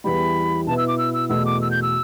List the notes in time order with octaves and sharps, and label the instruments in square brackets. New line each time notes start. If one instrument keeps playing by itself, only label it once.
[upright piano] E2 E3 G3 [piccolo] B5
[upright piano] B2 B3 E4 [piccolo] A5
[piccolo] E6
D6
E6
E6
[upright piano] E2 B2 A3 [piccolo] E6
[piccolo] D6
E6
G6
E6